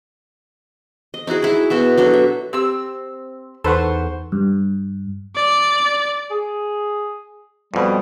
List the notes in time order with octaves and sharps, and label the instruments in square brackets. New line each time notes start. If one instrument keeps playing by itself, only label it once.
[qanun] D#5
D#4 E4 F#4 G#4
E4 G#4
B2 F#4 E5
F#3 D4 F#4 A4
E5
[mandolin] C4 E6 [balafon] G4
[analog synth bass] E2 [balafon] D#4 C6 [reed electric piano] A4 B4 F#5 [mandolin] C5 C#6
[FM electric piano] G2
[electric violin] D5
[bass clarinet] G#4
[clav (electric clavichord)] F2 B2 [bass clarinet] G3